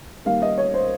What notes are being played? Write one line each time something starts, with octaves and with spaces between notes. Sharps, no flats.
D#3 G3 A#3 F5
D#5
C#5
C5